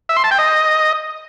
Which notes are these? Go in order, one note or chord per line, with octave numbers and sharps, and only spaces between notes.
E5
C6
A5
G5
D#5